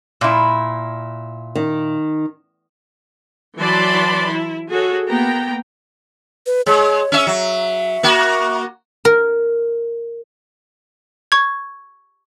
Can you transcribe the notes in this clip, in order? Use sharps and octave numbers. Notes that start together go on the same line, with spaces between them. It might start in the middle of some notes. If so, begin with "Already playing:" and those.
A#2 E4
D#3
E3 F#3 D5 A5 B5 C6
E4
F#4 G#4 A4 C#5
A#3 B3 G5 A#5
B4
G#3 C#5
C#4 E5
F#3 E5
A#3 F#4
A#4
C#6 G#6